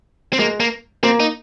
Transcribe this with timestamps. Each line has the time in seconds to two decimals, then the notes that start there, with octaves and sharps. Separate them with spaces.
0.33 C4
0.39 G#3 A#3
0.60 A#3
1.03 A#3 C4
1.20 D#4